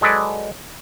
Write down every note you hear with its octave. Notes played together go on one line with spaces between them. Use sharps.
F#3 G#3 A4 B4 D5